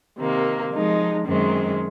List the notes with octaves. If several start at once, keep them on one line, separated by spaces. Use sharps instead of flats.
C3 D#3 A#3
F3 G#3 D#4
F#2 D#3 G#3 C4